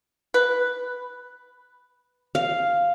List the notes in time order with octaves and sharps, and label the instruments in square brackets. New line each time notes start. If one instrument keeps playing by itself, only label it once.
[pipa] B4
[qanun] F5